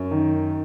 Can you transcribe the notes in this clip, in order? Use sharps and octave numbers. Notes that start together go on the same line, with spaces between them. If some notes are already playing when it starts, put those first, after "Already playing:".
Already playing: F#2
D#3